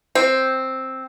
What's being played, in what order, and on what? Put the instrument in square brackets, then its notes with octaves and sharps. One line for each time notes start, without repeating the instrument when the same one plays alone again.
[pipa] C4